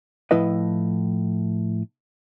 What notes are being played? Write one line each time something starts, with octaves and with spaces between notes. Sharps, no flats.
A2 F3 E4 B4 D#5